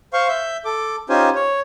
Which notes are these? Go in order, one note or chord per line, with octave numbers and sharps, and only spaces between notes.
C5 F5 C6 C#6
E5 G6
A4 D6
C#4 D#4 F4 G4 C5 G#5
C#5